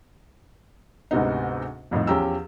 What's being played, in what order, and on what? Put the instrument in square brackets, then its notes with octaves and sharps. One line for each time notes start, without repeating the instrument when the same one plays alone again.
[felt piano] D2 G#2 C3 B3 D#4
C2 F2 A2 D#4
E2 F3 C#4 G4 A#5 E6